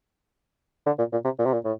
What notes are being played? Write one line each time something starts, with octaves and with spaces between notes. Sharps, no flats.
D3
A#2
A#2
C3
A#2
C3
A#2
A2